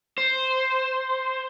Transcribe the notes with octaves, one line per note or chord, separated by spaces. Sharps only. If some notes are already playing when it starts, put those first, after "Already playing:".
C5